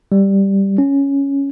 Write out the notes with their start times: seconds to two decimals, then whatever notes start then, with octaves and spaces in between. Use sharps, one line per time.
0.12 G3
0.78 C#4